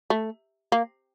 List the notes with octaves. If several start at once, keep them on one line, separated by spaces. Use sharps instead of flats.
A3
A#3